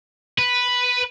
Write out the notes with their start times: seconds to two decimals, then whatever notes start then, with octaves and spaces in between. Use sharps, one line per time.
0.38 B4